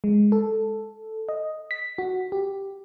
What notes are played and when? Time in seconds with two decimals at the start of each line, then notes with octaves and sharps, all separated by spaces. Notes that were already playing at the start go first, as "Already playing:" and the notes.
0.04 G#3
0.32 A4
1.29 D#5
1.71 B6
1.98 F#4
2.32 G4